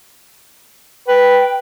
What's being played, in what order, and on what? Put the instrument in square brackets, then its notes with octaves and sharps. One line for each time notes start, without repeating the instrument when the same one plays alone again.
[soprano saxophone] B4 [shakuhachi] G5